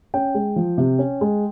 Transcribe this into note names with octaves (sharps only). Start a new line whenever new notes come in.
C#4 G5
G#3
F3
C3
C#4
G#3